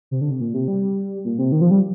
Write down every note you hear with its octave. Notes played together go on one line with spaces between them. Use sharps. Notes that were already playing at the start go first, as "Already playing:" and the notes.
C3
D3
C3
A#2
C3
G3
A#2
C3
D#3
F3
G3